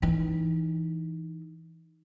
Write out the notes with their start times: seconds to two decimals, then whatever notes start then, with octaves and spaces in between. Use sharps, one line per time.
0.02 E3 D#4